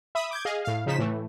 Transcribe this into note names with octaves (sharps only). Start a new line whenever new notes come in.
E5 B5 D#6
D6 G6 G#6
G#4 D#5 F5
A2 F5
C#3 F3 D#4 B6 E7
A2 E3 A3